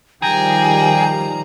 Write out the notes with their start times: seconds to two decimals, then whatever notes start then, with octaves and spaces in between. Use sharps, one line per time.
0.22 D#3 F3 G3 G#4 G5 A#5